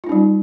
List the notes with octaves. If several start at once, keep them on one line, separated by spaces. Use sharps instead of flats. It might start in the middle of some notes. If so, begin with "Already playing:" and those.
G3 C#4 D#4 F4